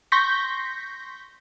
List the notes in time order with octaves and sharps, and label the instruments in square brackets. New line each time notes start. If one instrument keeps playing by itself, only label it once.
[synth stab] C6 C#6 G6 A#6 B6